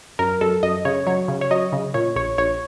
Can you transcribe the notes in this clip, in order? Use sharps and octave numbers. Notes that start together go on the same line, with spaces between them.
F#2 A#4
F#2 A4
F#2 D#5
C#3 C#5
F#3 C#5
C#3
C#5
F#3 D#5
C#3
A#2 C#5
A#1 C#5
A#1 C#5